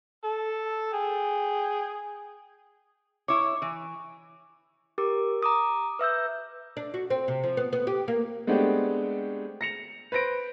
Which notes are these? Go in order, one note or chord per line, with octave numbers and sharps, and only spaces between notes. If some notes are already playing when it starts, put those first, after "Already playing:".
A4
G#4 G5
E4 C#5 D6
E3
G4 A#4 D6
A#5 D6 D#6
B4 E5 E6 G6
D4
F#4
C4
C3
F3
B3
B3
G4
A#3
G#3 A3 B3 C4 D4 G4
A#6 C#7 F7
B4 C5 A#6 D7